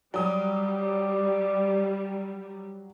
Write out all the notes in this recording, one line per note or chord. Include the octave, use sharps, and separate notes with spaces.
F#3 G3 D5 D#6